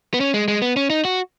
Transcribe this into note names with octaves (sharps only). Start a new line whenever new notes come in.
B3
C#4
G#3
G#3
B3
C#4
D#4
F#4